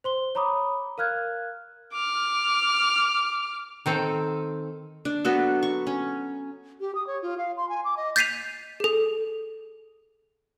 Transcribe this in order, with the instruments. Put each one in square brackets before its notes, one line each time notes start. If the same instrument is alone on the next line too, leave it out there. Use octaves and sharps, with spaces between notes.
[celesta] C5 C6 G7
C#5 A#5 B5 D6 D#6
A#4 F5 F6 F#6 G#6
[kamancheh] D6 F6
[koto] D#3 C4 A4
[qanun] D4
F#3 B3 F#4 A4
C#6
C#4
[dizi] G4
D#6
C#5
F4
F5
C6
G#5
D6
D#5
[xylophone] G6 A6 B6 C7 D#7 F7
G#4 A4